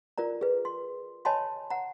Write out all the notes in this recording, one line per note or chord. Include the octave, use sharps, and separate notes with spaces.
F4 A#4 D5 A#5
G#4 B4
C6
C#5 D#5 G#5 A5 B5 C6
F#5 A#5